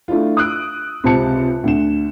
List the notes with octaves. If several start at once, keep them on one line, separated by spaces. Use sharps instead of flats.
A3 D4 E4 F4
D#6 E6 F#6 D7
C#2 C3 C5 A5 C#7
D2 D3 E7